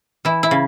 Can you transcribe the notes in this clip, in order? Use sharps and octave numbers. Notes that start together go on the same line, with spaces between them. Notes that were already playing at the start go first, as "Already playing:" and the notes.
E3 E4
E4
C#3